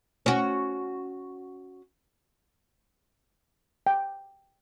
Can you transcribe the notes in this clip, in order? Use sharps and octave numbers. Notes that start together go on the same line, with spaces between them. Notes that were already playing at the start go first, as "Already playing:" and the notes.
C#4 F#4
G5